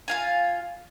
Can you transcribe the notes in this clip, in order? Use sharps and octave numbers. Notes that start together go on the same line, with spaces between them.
F4 F5 G#5